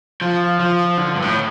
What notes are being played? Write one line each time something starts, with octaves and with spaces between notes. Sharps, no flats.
F3
F3
D3
G2
A2